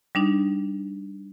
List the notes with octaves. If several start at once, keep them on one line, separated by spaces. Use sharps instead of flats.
G3 D4 D#4